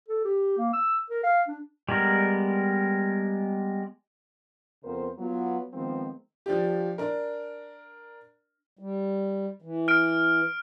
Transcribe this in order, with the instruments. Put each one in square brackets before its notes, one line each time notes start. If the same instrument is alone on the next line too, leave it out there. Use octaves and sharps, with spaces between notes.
[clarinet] A4
G4
A#3
E6
A#4
F5
D4
[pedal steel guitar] G3 G#3 B3 A#4
[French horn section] F2 C#3 B3 A#4 C5
F#3 B3 F4
D#3 F3 G#3 B3 C4 D#4
[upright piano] F3 D4 G4
D4 A#4
[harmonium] G3
E3
[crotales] F6 D7